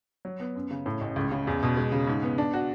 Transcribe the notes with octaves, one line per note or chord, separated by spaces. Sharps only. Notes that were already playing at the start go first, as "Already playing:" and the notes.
F#3
B3
F#2
C#3
A2
A1
C#2
C#3
E2
B2
G#3
C#3
G#2
B3
D4
F#4